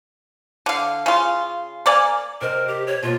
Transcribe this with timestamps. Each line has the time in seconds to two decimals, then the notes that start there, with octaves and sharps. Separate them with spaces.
0.66 D3 F5
1.06 C#3 F4
1.86 A#3 D5 F5 G#5
2.41 C3 A#4 C5 D#5
2.67 G4
2.87 C#5
3.03 B2 A#3 F4